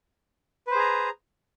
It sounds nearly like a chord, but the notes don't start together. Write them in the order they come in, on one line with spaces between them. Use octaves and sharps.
B4 C5 G#4 A#5